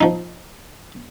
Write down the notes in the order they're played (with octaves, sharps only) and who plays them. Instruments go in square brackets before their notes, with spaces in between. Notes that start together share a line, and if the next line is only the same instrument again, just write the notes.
[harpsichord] F3 D#4